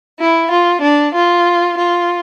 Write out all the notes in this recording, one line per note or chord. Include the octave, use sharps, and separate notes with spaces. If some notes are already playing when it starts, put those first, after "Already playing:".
E4
F4
D4
F4
F4